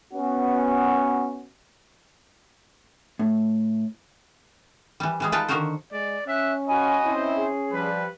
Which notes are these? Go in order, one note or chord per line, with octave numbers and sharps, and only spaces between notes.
B3 C#4 F#4
A2
E3 G3
E3 G3 G#3
D#4 F4 B4 F5 G5 A5
D3 D#3 F#4 A#4 C5
G#3 D5
C#4 E5 F#6
F4 F#4 D#5 G#5 B5
C4 C#4 E4 C5
G#4
F3 G3 B4